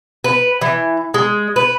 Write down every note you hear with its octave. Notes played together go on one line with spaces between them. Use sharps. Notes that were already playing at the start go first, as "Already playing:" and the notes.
B4
E3
G#3
B4